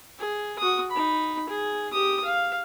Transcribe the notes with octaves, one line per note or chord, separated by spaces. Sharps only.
G#4
F#4 D#6
D#4 B5
G#4
G4 D#6
F5